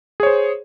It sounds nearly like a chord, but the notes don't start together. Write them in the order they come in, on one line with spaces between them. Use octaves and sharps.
G#4 C#5 C5